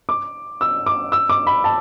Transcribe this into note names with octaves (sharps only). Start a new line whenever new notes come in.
D6
E6
D6
E6
D6
B5
A5